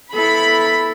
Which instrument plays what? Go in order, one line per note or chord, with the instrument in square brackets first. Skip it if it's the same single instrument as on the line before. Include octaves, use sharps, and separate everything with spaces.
[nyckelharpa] B3 E4 [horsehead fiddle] A4 [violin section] B5